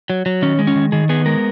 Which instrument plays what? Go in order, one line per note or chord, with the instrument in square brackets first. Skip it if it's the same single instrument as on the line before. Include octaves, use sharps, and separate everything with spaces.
[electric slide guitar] F#3
F#3
D#3 C#4
G#3
C#4
D#3
D#3 G#4
B3 G#4
G#3 A#4